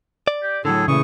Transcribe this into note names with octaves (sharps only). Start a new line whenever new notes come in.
D5
G4
A2 D3 F#3 G#4 A4
A#2 C#3 E3 A3 C#6 D#6